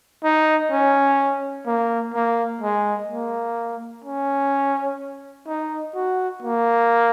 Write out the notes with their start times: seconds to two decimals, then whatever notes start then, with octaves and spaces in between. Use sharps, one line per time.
0.24 D#4
0.72 C#4
1.67 A#3
2.14 A#3
2.62 G#3
3.10 A#3
4.04 C#4
5.48 D#4
5.95 F#4
6.43 A#3